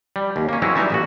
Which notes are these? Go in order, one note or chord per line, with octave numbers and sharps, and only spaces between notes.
G3
D#2
A#3 C#4
E3 F#3 G#3 C4 C#4 E4
E3 G3 D#4 E5 A5
A1 A#2 F#4